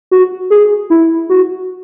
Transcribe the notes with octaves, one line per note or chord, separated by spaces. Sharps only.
F#4
G#4
E4
F#4